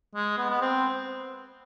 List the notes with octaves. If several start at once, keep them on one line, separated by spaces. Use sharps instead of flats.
G#3
B3
B3
C4